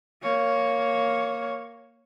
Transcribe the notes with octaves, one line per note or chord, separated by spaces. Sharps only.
A#3 C#5